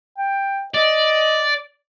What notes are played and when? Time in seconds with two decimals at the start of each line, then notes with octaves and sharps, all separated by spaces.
0.18 G5
0.74 D5 D#5